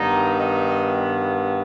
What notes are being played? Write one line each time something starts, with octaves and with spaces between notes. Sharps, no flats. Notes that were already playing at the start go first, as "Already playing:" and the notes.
Already playing: G2 D#3 B3 D#4
D#4